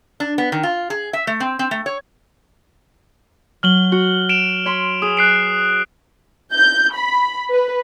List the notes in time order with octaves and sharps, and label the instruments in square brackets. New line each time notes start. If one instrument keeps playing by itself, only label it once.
[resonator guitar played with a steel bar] D4
B3
D#3
F4
G#4
E5
A3
C4
C4
A3
C#5
[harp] F#3 [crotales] F6 F#7 G7
[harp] F#4
[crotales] D7 E7 F7
[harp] C#5 B5 C6
[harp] G#4 B4 [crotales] D#6
[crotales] F#6 C7 D7
[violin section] G6
B5
B4